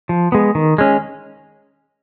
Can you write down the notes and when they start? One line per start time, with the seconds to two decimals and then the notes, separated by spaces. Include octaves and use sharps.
0.09 F3
0.32 G#3 B3
0.55 D#3
0.78 G#3 C#4